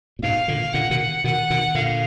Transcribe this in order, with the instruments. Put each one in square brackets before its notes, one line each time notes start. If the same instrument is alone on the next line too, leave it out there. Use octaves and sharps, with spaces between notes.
[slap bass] A#2
[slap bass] G#2 B2 [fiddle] F5
[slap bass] A#2 D3
[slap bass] A#2 D3 [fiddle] F#5
[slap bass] B2 D#3
[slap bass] B2 D#3 [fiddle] F#5
[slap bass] B2 D#3
[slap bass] A#2 D3 [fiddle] F5